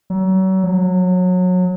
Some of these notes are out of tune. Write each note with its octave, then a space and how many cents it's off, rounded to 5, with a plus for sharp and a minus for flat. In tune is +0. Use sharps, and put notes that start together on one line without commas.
F#3 +35
F#3 -25